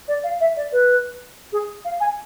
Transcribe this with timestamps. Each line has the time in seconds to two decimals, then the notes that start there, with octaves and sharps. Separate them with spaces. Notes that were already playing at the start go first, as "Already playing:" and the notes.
0.08 D5
0.24 F5
0.41 E5
0.57 D5
0.72 B4
1.53 G#4
1.85 F5
2.00 G#5